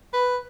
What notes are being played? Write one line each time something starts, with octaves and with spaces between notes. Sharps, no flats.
B4